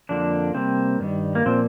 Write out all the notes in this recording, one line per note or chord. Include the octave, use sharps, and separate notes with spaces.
F2 D3 F3 A#3 D4
C3 G3 A#3 C4
G2 D#3 G3
A#3
A#2 F3 A#3 C4